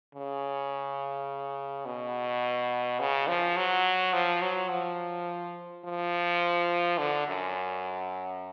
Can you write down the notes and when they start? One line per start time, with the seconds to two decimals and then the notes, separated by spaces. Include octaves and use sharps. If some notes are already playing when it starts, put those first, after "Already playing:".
0.15 C#3
1.86 B2
3.00 C#3
3.28 F3
3.57 F#3
4.13 F3
4.42 F#3
4.70 F3
5.85 F3
6.98 D3
7.27 F#2